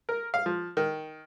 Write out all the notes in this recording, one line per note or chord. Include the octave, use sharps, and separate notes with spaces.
A#4
F5
F3
D#3